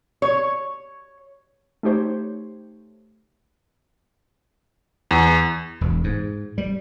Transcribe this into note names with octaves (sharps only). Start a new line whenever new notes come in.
C#5
A3 D#4 G4 C5 C#5
E2
E1
G#2
G3